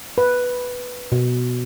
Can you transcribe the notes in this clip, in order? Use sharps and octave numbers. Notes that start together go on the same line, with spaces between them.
B4
B2